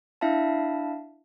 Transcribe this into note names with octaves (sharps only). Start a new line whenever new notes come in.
D4 E4 E5 F5 A5